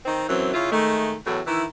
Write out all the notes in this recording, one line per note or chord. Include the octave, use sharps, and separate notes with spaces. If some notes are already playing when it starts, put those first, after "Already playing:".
D#3 C4 D#4
F#2 E3 F#3 C4
C#3 E4 F4
D#3 G#3 A3
E2 A2 F#3
D#3 E3 E4